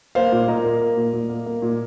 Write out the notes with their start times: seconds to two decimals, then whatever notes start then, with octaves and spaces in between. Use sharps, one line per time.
0.15 A#3 C5 F5
0.32 A#2
0.48 A#2 A#4 D#5
0.64 A#3
0.81 A#3
0.97 A#2
1.13 A#2
1.29 A#3
1.46 A#3
1.62 A#2